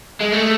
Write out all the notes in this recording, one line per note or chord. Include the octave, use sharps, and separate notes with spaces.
G#3
A3